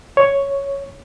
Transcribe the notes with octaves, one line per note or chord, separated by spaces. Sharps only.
C#5